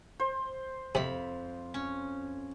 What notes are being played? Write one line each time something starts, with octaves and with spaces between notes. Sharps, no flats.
C5
F2 C3 B5
C#4